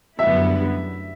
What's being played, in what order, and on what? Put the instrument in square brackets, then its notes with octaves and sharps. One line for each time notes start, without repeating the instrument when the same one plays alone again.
[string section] F#2 D3 G3 B3 E4 [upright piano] E5